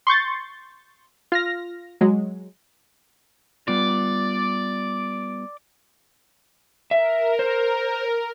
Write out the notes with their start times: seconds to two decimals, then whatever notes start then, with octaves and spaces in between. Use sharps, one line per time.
0.07 C6 C#6 G6 A6
1.32 F4 F6 A#6
2.01 F#3 G#3
3.68 G3 B3 F4 D5
6.91 A#4 E5
7.39 C5